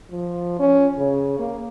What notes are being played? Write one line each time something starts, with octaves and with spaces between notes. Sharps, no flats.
F3
C#4
C#3
A#3